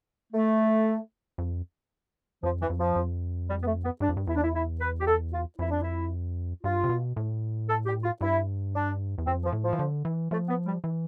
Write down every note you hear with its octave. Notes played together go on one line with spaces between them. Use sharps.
A3
F2
F2 F3
E3
F2
F3
F2
G3
B3
A3
B3
G2 D4
F2
G2
E2 E4
D4
E4
E4
B4
G4
A4
F4
F2 E4
D4
E4
G2 F4
C3
B2
A2
A4
G4
F4
G2 E4
D4
E2
F2 C4
F3
A2
F3
E3
D3
E3
F3 A3
B3
G3
E3